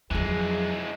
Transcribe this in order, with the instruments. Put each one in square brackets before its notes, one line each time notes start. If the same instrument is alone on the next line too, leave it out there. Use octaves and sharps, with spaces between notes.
[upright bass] F2 F#3 [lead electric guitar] E3 G#3 [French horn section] G#4